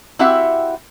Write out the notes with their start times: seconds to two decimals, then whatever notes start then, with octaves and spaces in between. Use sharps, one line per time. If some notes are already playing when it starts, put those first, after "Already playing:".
0.19 C4 E4 F#4 G4 E5 F#5